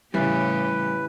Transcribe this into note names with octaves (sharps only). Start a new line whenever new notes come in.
A2 C#3 E3 G3 G4 B4 E5 F5